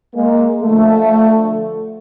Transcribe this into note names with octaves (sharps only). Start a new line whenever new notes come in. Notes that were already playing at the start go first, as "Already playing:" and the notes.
G#3 A#3
D3 F3 A3